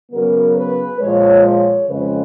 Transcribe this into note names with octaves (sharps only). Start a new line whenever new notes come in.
C#3 F#3 B3 A#4
B4
A#2 F3 G#3 C#5
C#5
F2 C#3 F3 G#3 B4